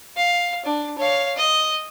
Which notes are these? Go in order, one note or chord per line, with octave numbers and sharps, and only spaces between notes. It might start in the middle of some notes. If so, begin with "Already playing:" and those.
F5
D4
C#5 F5
D#5